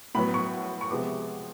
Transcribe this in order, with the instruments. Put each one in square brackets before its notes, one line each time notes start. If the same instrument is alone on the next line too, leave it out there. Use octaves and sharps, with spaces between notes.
[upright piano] A2 F#3 B3 B5
C#6
C#6
C3 F3 G#3 B3 D6